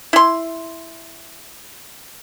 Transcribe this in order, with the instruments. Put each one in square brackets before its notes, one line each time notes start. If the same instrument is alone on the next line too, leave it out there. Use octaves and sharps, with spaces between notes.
[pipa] E4 C6